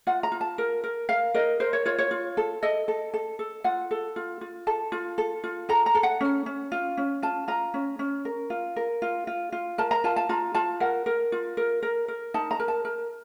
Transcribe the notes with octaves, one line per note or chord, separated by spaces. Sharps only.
F4 F#5
A#5
F4
A5
A#4
A#4
A#4 F5
A#4 D#5
A#4 C5
C#5
F4 C#5
C#5
F4
A4
A4 D#5
A4
A4
A4
F4 F#5
A4
F4
F4
A4 A5
F4
A4
F4
A4 A#5
A#5
A4
F#5
C#4
C#4
F4
C#4
F4 A5
F4 A#5
C#4
C#4
A#4
F4
A#4
F4
F4
F4
A#4 A5
A#5
F4 A5
A5
F4 A#5
F4 A5
A#4 F#5
A#4
F4
A#4
A#4
A#4
D#4 A5
A#5
A#4
A5
A#4